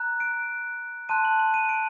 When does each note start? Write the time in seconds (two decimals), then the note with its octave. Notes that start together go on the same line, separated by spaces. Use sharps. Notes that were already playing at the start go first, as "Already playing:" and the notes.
Already playing: A#5 F#6
0.20 D7
1.09 A5 C6 F#6 D#7
1.25 F#7
1.39 F#7
1.54 D#7
1.69 D7